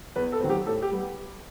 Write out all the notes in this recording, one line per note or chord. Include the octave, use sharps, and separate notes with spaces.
E2 B4
A4
D#3 F#3 C4
G4
A2 A4
G4
G3 B3